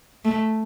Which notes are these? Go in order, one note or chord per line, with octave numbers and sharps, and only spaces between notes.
A3